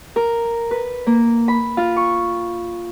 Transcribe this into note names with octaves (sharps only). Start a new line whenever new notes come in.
A#4
B4
A#3
B5
F4
C#6